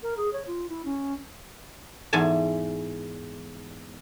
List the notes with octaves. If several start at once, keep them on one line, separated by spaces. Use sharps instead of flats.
A#4
G#4
C#5
F4
E4
C#4
E2 G#2 G#5 A5